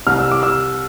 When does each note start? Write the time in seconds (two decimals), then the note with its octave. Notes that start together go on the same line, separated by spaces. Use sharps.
0.07 C2 C3 G3 F6
0.19 E6
0.32 D6
0.43 E6